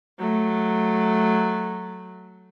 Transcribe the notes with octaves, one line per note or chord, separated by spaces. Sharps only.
F#3 A3